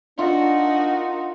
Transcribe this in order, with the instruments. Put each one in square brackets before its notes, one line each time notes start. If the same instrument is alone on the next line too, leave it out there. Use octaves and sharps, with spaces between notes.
[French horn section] D4 [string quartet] D#4 F#4 A#4 [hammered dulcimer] F4 E5